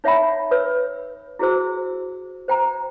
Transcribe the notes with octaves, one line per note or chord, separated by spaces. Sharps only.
D#4 C#5 E5 F#5 G5 B5
B4 C#5 E6
E4 F#4 G#4 C5 E6
C5 G5 A#5